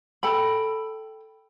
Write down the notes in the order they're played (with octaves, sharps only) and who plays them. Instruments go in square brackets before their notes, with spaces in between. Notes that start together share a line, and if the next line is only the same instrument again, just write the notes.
[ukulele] A4 G5 B5